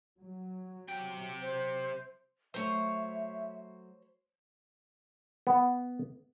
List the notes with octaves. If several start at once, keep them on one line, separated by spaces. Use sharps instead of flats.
F#3
C3 G5
C5
F#3 A3 C5 C#5 E5
B3